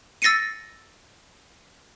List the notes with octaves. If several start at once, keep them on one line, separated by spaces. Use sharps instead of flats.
E6 A6 A#6 C7 C#7 D#7